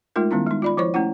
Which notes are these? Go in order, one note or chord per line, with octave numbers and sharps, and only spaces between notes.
G#3 A3 D#4 F4 A#4
D#3 G3 B3 C#4 E4
G#3 D#4
F4 D5 B5
F3 E4 C5 C#5 C#6
A3 C#4 E4 F#5